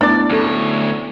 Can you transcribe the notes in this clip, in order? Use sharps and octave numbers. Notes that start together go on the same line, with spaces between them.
A3 B3 D4 E4 D5
D2 C#4 A4 C#5